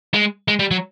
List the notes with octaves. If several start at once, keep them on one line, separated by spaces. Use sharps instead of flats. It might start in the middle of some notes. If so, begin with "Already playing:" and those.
G#3
G#3
G3
F#3